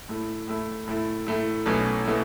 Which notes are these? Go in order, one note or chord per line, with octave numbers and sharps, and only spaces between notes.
A2 A3 E4
A2 A3 E4
A2 A3 E4
A2 A3 E4
B1 B2 A3 C#4 E4
B2 A3 C#4 E4